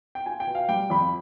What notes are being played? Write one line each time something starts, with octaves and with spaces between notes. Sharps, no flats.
G5
F4 G#5
G5
B2
F5
G3 G5
F2 B5